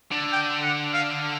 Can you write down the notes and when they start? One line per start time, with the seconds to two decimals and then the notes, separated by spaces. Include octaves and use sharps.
0.12 D3
0.32 G5
0.62 F#5
0.93 F5